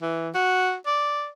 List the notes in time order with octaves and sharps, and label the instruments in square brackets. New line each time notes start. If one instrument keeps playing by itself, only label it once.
[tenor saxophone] E3
F#4
D5